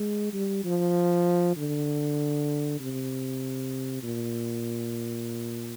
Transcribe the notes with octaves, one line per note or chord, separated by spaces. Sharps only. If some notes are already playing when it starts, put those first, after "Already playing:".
Already playing: G#3
G3
F3
D3
C3
A#2